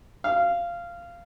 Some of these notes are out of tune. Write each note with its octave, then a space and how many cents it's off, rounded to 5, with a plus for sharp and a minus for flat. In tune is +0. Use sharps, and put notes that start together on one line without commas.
F5 -15